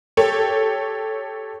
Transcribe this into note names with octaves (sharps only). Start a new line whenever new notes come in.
G4 A4 C#5